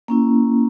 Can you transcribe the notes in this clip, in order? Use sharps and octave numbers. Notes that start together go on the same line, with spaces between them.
A#3 C#4 E4